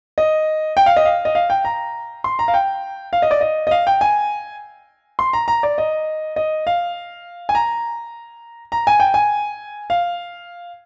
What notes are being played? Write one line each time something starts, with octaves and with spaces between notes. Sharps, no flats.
D#5
G5
F5
D#5
F5
D#5
F5
G5
A#5
C6
A#5
F5
G5
F5
D#5
D5
D#5
D#5
F5
G5
G#5
C6
A#5
A#5
D5
D#5
D#5
F5
G#5
A#5
A#5
G#5
G5
G#5
F5